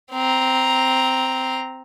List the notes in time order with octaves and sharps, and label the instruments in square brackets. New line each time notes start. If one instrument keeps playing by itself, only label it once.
[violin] C4 A#5